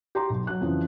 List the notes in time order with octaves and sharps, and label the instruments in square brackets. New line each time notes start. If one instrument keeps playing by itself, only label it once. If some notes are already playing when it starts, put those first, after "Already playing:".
[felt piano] G4 A#5 C6
B1
F#3 F#6
F2 C#3 E3 F3